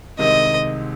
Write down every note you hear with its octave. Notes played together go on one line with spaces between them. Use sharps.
C2 C3 D#3 G#3 D#5